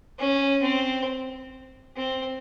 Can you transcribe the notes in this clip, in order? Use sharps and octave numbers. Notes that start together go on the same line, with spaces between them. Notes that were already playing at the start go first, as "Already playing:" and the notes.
C#4
C4
C4